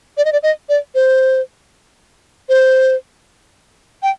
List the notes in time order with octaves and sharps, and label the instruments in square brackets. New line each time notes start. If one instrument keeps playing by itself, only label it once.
[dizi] D5
D#5
D5
D#5
D5
C5
C5
G5